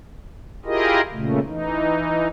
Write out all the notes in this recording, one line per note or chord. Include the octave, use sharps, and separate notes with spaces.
E4 F4 G4 G#4 A#4 D#5
A#2 C#3 A3
E3 D#4